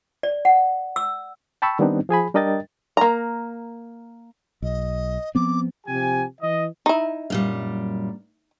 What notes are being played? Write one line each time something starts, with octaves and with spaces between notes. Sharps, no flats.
D5
F#5
E6
G5 A5 B5 C#6 E6
D#3 G3 B3 C4 D4 D#4
F3 G#4 G#5 B5
G3 D4 A#4 D#5 G5 A6
A#3 A#5
B1 D#5
F3 B3 C4 D6
C3 F3 G4 G#5
E3 D#5
D#4 E4
F#2 A#2 G3